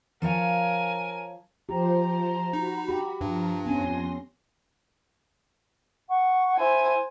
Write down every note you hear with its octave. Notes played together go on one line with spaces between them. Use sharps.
F3 A#4 C#5 F5 G#5
F3 G4 C5 A#5
D#4 F#4 B5
G4
G2 F3 A#5
F2 B3 C#4 G#5 C6 A#6
F#5 C#6
E4 C5 G#5